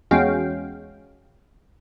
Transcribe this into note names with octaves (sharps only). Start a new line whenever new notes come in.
E2 G#3 C#4 F#4 F5 G5